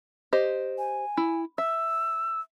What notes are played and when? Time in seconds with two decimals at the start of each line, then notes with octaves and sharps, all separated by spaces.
0.33 G4 C5 D#5
0.78 G#5
1.17 E4
1.58 E5 E6